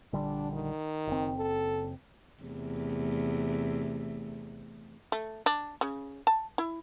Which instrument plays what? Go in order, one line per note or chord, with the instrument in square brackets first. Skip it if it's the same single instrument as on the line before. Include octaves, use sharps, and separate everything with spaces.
[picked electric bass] A#1 D3 G3 [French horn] D4
[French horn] D#3
[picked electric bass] F#1 C4
[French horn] A4
[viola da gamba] E2 C3 A3
[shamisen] A3
D4
C#3
A5
E4